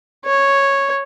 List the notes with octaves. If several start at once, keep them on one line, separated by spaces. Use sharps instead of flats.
C#5